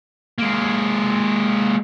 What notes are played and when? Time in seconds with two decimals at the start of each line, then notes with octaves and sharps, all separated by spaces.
0.38 G#3 A#3